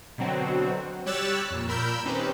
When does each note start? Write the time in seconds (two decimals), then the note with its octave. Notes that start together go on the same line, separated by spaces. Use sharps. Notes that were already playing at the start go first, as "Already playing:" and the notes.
0.18 B2 D3 F#3 C4 F#4
1.06 G3 G4 C#5 E6 F#6 A6
1.50 F2 A#2
1.68 A#2 A#4 B5 E6 G6
2.05 D#3 C4 C#4 G4 B4 C5